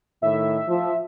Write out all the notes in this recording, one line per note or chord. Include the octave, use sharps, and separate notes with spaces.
A2 D#3 E5
F3